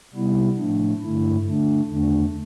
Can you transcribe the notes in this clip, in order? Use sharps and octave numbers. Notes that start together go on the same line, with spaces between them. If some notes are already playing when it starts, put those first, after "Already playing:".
C3 G3 B3 E4
A2 F3 A3 D4
G2 D3 A3 E4
D3 A3 D4
E2 D3 A3 D4